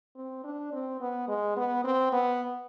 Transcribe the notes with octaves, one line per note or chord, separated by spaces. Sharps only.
C4
D4
C4
B3
G#3
B3
C4
B3